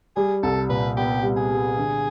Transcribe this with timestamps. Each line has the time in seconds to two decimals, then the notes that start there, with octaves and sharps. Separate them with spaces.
0.16 G3 G#4
0.43 C2 A4
0.69 A#2 B4
0.97 B3 G4
1.23 G3
1.37 G#4
1.51 G3
1.78 D3